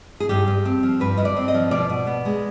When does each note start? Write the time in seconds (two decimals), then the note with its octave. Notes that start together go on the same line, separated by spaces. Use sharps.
0.20 G#4
0.29 G2 G4
0.48 G2
0.65 C4
0.83 F3
1.00 G2 B4
1.17 G2 D#5
1.25 D5
1.36 C4
1.48 D#5
1.54 F3
1.71 B2 D5
1.90 B2
2.07 B3
2.25 G#3